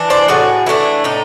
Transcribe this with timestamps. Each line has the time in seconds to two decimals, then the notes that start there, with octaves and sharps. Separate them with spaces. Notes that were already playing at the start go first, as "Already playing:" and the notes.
Already playing: E3 D4
0.10 C5 D5
0.28 A2 F#4 G#4
0.66 E3 A3 D4 E4
1.04 A2 D#4